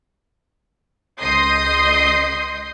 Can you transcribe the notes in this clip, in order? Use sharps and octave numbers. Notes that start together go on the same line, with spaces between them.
C#2 D#5 C6 D#6 G6 C7